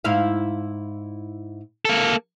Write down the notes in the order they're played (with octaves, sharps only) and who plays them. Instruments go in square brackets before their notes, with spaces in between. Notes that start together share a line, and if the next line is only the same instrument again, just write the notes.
[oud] G#2 E4 F5
[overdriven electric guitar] A#3 A4